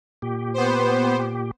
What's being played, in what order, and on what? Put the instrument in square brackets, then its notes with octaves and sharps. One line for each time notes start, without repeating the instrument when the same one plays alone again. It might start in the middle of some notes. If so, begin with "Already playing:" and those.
[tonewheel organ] A#2 G4
[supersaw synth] B3 C5